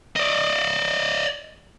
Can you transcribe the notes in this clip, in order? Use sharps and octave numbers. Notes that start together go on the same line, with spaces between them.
D5 D#5